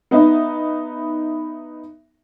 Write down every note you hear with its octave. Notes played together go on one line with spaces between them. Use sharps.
B3 D#4 E5